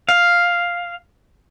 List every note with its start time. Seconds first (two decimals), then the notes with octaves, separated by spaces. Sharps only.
0.09 F5